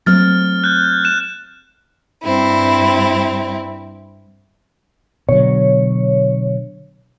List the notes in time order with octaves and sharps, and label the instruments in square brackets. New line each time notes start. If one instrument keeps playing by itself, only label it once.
[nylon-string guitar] F#3 A3 C4 [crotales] F6 A6
[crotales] F#6 G6
F#6 E7
[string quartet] G2 C4 E4
[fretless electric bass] B2 D3 F#3 [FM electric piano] C#5